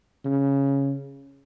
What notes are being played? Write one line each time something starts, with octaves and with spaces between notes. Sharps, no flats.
C#3